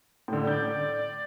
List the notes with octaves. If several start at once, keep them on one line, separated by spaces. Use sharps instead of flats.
A2 D3
D5 G6